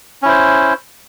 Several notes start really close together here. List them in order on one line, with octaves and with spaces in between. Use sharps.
C#4 E4 C5